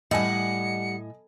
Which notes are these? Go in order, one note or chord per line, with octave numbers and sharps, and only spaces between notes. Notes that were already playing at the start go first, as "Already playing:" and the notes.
A2 G3 D#5 F#5 G#5 C#7